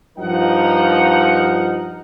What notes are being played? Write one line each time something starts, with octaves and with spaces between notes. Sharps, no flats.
G2 F3 D#4 A#4 D#5 F#5